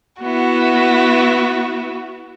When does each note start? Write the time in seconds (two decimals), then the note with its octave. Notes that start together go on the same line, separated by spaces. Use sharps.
0.22 B3 E4 F#4